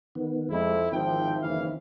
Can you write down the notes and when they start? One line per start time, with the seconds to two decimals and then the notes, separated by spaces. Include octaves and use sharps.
0.15 D#3 B3
0.51 F2 G#3 E4
0.93 G#1 D#3 F3 C4 E4 G5
1.42 F#1 E3 F5